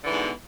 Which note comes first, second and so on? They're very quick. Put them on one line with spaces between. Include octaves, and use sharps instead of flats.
D3 E3 G#2 B2